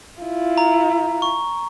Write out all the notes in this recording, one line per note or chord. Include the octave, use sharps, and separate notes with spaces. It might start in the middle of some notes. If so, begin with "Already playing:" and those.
E4 F4
A#5
C#6